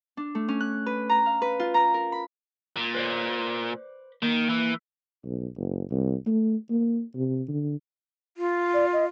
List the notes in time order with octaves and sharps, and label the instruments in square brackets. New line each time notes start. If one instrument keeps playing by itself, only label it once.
[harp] D4
A3
C#4
F#6
B4
A#5
F5
B4
F4
A#5
A#4
B5
[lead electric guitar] A#2
[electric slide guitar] B4 C5 D5
[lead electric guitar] D#3 [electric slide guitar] A#3
[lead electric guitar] E3
[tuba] B1
F#1
C2
A3
A#3
C3
D3
[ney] F4
[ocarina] D5
D#5